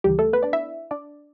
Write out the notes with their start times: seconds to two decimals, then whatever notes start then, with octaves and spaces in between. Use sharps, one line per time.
0.04 D2 C#3 E3 G3 G4
0.19 A3 A4
0.33 B3 B4
0.43 D4 D5
0.53 E4 E5
0.91 D4 D5